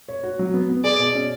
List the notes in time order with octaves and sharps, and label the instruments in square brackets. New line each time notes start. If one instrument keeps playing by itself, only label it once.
[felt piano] C#5
F#4
F#3
B3
B3
[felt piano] G#4 [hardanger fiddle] D5
[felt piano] B2
C#4